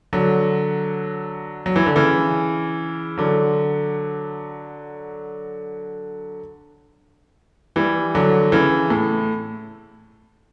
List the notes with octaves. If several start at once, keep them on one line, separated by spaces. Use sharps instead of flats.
D3 F#3
F#3
E3
D3
C#3 E3
D3 F#3
E3 G3
D3 F#3
C#3 E3
A2